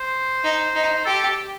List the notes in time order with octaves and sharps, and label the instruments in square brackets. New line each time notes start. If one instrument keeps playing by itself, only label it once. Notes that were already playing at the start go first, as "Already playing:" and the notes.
Already playing: [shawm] C5
[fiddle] D#4
D#4
[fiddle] G4 [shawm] A4